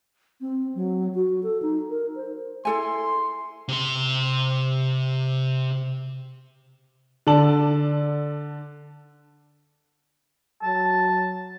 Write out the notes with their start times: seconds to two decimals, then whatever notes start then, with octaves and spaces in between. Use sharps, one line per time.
0.41 C4
0.75 F#3
1.15 F#4
1.43 A4
1.62 D#4
1.90 A#4
2.16 C5
2.65 E4 A4 G#5 C6
3.68 C3 C6
7.27 D3 A4 D5 A5 F#7
10.63 F#3 A5